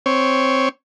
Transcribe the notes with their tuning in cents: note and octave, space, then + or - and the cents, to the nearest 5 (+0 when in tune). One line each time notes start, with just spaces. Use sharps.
C4 +0 C#5 +0